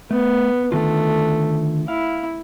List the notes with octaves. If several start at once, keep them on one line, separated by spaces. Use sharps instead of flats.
A3 B3
D3 D#3 A3 F4
E4 F5